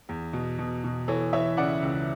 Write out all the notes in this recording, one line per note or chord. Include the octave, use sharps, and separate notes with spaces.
E2
B2
B2
B2
E3 A4 C#5
E3 C#5 E5
C#3 D5 F#5
C#2